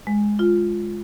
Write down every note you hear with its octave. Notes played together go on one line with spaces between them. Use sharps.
G#3
F4